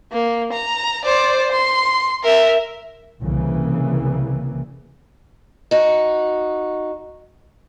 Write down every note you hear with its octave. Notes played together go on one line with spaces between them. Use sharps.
A#3
A#5
C5 D5
C6
A#4 E5
C2 C#3 E3 A#3
D#4 F#4